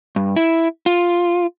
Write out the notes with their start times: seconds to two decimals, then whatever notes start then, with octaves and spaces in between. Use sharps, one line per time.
0.16 G2
0.36 E4
0.86 F4